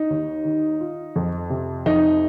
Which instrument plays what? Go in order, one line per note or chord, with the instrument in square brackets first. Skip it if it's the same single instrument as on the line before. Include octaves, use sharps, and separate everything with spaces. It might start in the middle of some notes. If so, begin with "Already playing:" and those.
Already playing: [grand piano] D#4
[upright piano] D#2
D#3
F4
F2
C3
[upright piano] F2 [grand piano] D#4